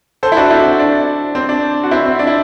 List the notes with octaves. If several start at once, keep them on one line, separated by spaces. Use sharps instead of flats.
A4 C5
E4
D4 F#4
C4 E4
D4
C4
D4
F#4
C4 E4
C4
D4
E4